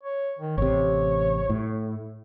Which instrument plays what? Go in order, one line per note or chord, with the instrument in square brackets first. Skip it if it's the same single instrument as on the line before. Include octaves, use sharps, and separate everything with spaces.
[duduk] C#5
D#3
[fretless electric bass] A1 C3 [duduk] C#5
[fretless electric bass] A2